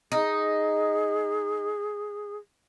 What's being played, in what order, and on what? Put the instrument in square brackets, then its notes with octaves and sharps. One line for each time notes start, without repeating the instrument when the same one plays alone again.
[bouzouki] D#4 [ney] G#4